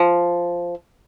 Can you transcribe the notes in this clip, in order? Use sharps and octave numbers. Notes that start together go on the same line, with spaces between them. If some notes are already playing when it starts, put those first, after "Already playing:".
Already playing: F3